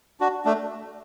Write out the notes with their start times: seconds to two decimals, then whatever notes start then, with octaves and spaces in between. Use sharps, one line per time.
0.20 D4 F#4
0.45 A3 D4